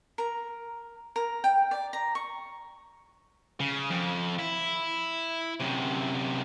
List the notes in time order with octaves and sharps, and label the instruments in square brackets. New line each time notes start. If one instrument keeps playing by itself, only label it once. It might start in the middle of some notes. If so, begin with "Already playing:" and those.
[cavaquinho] A#4
A#4
G5
D5
A#5
C#6
[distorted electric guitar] C#3
F2
E4
F#2 C3